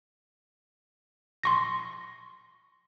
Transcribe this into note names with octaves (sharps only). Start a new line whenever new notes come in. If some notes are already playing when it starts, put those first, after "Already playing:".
C6 C#6 A#6